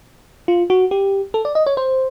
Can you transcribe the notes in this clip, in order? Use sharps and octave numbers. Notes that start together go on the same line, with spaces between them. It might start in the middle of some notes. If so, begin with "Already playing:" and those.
F4
F#4
G4
A4
D5
D#5
C#5
C5